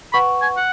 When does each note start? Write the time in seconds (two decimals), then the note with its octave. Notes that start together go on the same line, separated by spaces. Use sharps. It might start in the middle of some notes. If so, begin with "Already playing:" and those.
0.13 B4 F#5 B5 C#6
0.42 G#5
0.57 F#5